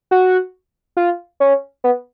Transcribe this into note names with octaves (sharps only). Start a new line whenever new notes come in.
F#4
F4
C#4
B3